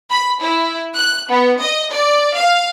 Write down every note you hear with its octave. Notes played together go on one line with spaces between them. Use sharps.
B5
E4
F#6
B3
D#5
D5
F5